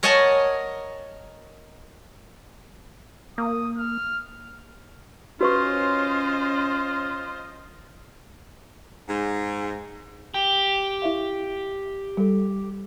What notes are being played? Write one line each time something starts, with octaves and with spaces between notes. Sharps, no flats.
A#4 C#5 D#5 F#5 G#5 A5
A#3 D#6
F6
C#4 F4 F#4 B4 C5 D#5 C#6
G#2
G4
E4 E5 F5
G3 A4